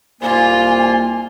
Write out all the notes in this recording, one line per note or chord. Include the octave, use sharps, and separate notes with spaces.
C2 G#2 A#3 F4 G#5